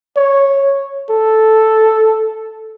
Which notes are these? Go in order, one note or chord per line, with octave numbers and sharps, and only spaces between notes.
C#5
A4